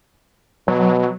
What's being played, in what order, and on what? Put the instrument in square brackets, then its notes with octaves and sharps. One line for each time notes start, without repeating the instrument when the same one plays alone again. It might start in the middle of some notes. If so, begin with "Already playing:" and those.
[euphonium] B2 [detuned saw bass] F#3